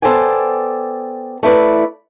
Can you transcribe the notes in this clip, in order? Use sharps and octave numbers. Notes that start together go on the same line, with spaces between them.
B3 A4 C5 D5 G5 G#5
A3 E4 B4 D5